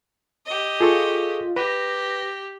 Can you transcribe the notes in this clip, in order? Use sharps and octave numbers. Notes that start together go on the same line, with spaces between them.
G4 D#5
F4 G#4 A4 C#6
G4 B4 A#6